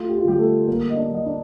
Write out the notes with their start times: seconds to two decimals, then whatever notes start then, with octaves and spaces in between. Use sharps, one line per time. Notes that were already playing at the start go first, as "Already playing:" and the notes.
Already playing: A3 F4
0.09 G4
0.18 F4
0.24 D3 G3 G4
0.38 A3 A4
0.67 G3 A#3 A#4
0.90 D#5
0.96 D4 D5
1.11 G3 D#5
1.26 D4 D5